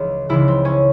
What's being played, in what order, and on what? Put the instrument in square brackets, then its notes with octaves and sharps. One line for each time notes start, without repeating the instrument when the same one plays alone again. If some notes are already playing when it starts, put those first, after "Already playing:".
Already playing: [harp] C#2 C#3 E3
C#2 C#3 E3 E4
C4
C#4